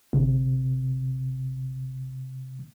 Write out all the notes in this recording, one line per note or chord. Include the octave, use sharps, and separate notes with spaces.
G1 C3